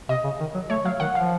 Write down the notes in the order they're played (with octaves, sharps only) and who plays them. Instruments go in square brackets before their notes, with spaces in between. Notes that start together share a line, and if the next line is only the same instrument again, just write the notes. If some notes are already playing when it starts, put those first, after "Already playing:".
[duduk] C3 [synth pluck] D#5
[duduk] C#3
D#3
F#3
[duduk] A3 [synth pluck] C#5
[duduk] F#3 [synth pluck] F5
[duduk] D#3 [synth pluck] F#5
[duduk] F3 [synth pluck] F5